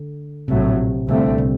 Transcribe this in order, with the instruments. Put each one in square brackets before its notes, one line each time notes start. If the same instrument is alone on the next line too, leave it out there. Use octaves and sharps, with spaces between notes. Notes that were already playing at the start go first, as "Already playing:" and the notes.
Already playing: [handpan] D3
[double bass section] A#1 A2 F#3 A3 [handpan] C3
[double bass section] C2 A#2 A3 C4 [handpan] D3
[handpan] C3